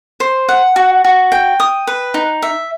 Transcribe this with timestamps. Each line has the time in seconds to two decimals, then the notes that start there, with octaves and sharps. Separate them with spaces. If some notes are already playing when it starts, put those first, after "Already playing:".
0.20 C5
0.49 F#5
0.76 F#4
1.04 F#4
1.32 G5
1.60 D#6
1.87 B4
2.14 D#4
2.42 E5